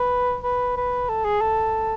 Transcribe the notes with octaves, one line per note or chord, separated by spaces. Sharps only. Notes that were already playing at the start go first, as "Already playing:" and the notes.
Already playing: B4
B4
B4
A4
G#4
A4